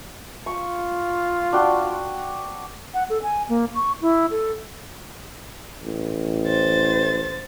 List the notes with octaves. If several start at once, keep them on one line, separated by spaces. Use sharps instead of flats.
F4 C#6
D4 F#4 G5
F#5
A4
G#5
A#3
C#6
E4
A4
A1
C5 A6